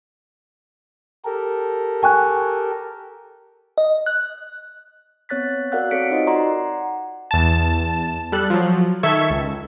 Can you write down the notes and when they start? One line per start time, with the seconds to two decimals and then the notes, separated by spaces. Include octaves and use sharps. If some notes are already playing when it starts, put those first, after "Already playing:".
1.25 G4 A4 A#4
2.03 G5 G#5 C#6 F#6
3.78 D#5
4.06 F#6
5.29 B3 C4 C#5 F#6 A6 B6
5.72 F#4 A#4 D5 F5 F#5 F#6
5.91 C4 A4 C#5 B6 C#7 D7
6.10 D#4 F4 F#4 A#4 C5 D#5
6.27 D5 F#5 A#5 C6
7.31 E2 A5
8.32 G3 A4 F#6
8.50 F3 F#3
9.03 D#3 A4 E5 C#6 G#6
9.30 C#2